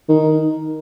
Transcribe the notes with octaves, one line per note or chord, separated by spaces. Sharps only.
D#3